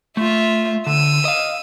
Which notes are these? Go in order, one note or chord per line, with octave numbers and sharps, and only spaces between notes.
A3 F4 E5
D3 E6 D#7
D#5 F5